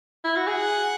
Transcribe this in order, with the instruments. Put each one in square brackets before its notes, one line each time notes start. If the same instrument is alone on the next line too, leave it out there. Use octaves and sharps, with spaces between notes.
[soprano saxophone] E4
F#4
[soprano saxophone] G#4 [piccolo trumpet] F#5